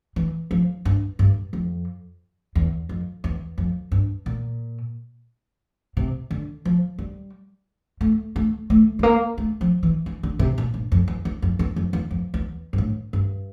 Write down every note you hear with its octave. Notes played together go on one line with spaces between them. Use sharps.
E3
F3
G2
G2
F2
E2
F2
E2
F2
G2
A#2
C3
D3
F3
G3
A3
A3
A3
A3
A#3
A3
F3
E3
E3
D3
C3
A#2
G2
F2
E2
E2
F2
E2
F2
E2
F2
E2
G2
A2
G2